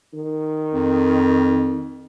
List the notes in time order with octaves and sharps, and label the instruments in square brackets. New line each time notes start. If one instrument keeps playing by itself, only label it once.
[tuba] D#3
[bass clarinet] F2